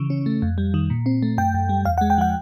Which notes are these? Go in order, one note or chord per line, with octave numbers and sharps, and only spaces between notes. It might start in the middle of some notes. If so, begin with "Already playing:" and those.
Already playing: C#3 E3
C#4
A3
F2
G3
D#3
A#2
C4
A3
F#2 G5
F#2
G3
E2 F5
F#5
G#3
G5
F3 F#5